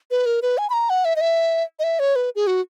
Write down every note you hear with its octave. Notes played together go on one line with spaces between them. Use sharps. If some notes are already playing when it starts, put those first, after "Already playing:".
B4
A#4
B4
G#5
B5
A#5
F#5
E5
D#5
E5
D#5
E5
C#5
B4
G#4
F#4